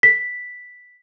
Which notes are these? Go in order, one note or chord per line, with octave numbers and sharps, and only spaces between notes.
B6